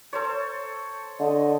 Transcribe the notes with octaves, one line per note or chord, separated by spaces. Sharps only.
A4 C5 C#5
D3 D#5